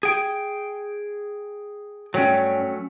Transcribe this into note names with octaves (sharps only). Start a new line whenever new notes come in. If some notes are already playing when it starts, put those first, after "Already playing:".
G#4 G5
G2 F#3 A3 C#4 C#5 G5